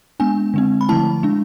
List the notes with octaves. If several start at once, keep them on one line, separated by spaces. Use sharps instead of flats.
G#3 B3 D4 G#5
D3 G#3 C4
B5
D3 F3 A3 E4 A5
G#3 D4